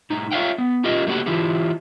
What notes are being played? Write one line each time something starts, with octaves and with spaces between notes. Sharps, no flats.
A2 D#4
F4 C#5 E5 F5 G5
B3
C#4 F4 G4 A#4 D#5
A3 A#3 F#4 G4 F#5
E3 E4 F4 G4